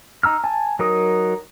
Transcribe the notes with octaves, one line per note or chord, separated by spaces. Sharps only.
D#4 A#5 E6 F6
G#5 A5
F#3 D#4 A#4 D#6